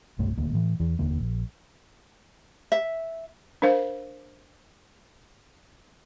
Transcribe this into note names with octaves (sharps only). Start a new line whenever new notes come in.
E1 C2 G2 A3
D#1 D2 A#3
A2 E3
E2 E3
F1 D#2 D3 A#3
A#1
E5
D4 A#4 C5 F5